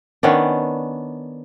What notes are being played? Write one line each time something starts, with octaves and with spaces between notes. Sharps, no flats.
D#3 B3 C#4 D4